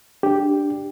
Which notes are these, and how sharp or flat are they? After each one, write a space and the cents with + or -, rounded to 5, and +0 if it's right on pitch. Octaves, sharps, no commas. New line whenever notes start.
D4 +0 G4 +0